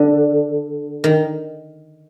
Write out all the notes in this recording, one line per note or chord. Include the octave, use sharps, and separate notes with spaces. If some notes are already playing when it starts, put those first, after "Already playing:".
Already playing: D3
D#3